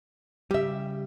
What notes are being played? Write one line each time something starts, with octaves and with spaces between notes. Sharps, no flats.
C#3 G3 G4 E5